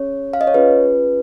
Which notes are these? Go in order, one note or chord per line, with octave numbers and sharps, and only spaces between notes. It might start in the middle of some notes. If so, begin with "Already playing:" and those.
Already playing: C#4 G#4 C#5
F5
D#5
C#5
C#4 F4 G#4 B4